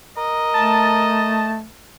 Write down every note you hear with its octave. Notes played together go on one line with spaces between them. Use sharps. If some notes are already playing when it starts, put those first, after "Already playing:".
A#4 D#5
A3 A5